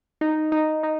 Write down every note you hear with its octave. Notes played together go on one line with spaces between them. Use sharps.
D#4
D#4
D#4